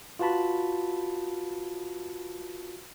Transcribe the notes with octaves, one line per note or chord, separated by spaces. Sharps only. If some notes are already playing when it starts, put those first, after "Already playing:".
F4 F#4 B4 A5 B5